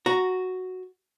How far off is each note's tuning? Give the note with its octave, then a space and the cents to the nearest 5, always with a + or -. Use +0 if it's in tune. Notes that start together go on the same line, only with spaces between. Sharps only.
F#4 +0 A#5 +0